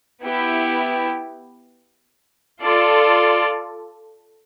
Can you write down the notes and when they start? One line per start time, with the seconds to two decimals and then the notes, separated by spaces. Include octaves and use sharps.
0.23 B3 E4 G4
2.61 F4 A4 D5